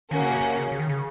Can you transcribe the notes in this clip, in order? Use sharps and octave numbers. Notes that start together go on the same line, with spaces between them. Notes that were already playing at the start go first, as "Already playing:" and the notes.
D#3 A#3 C#4 F#4
C#3
C3
C3
C#3
C#3
D#3
C#3